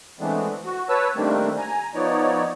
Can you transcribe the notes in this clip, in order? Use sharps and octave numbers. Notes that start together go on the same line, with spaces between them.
E3 G#3 A3 B3 C4 D4
F#4
B4 C#5 A5 E6
D#3 G3 A3 A#3 C4 D4
G#5 A#5
F3 B3 D#4 C#5 D5